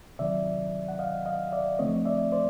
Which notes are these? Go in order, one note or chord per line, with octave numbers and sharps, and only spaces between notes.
C3 D#3 F#3 D5 E5
F#5
D#5 F5
D#5 F5
D5 E5
D3 F3 A3 C4 C#5 D#5
D5 E5
C5 D5